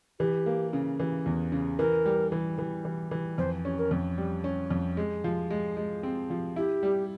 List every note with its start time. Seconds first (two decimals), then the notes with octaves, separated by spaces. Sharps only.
0.19 E3 G4
0.46 A#3
0.73 C#3
1.00 E3
1.26 E2
1.52 C#3
1.79 E3 A#4
2.05 G3
2.32 E3
2.58 E3
2.85 E3
3.11 E3
3.38 F2 C5
3.65 C#4
3.78 A#4
3.91 F2
4.18 G3
4.44 C#4
4.71 F2
4.97 G#3
5.24 F3
5.51 G#3
5.77 G#3
6.03 C4
6.30 F3
6.56 E4 G4
6.83 G3